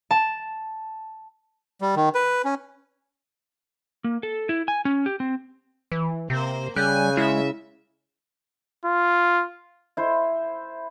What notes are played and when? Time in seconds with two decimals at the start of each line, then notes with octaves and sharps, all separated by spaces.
0.11 A5
1.81 G3
1.96 D#3
2.15 B4
2.45 C#4
4.04 A#3
4.23 A4
4.49 E4
4.68 G#5
4.85 C#4
5.06 G4
5.20 C4
5.92 E3
6.30 C3 A#3 C5
6.76 C#3 G3 G#5 F#6 G6
7.17 G#3 E4 E5
8.85 F4
9.97 E4 C5